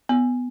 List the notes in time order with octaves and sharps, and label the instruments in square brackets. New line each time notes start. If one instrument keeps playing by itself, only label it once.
[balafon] B3